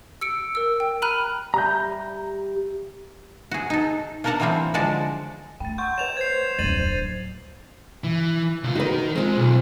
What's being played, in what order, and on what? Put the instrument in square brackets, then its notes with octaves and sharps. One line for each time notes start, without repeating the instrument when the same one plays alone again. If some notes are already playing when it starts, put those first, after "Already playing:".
[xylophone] E6 C#7 D7
A#4 E6
G5
A#5 B5 F6 F#6 D#7
[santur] G3 E5 [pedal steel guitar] A#5 G6
[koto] F#4 G#4
D#4 A4
A#3 D4 A#4 F#5 A5 A#5
E3 F#3 G3 A#3 C4
D3 F3 G#3 F#4 D5 A5
[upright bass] A3 [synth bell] G5 A6
[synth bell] F#5 C6 C#6 [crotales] G6
[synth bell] B4 C#5 [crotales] E7 F7
[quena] C5 [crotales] G#6 C7
[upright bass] D1 F2 [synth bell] F#3 [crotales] A6 D#7 F#7
[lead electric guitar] E3
C#2 F4
[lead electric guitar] D#3 D#4 [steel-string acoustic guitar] F#4 G4 B4
[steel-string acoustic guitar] A#4
[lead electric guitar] G#3 [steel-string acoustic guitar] C4 F4
[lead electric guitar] B1